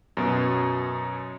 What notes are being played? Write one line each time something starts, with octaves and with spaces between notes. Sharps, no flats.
F#2 B2